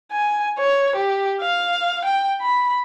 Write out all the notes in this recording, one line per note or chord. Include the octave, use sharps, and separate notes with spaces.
G#5
C#5
G4
F5
G5
B5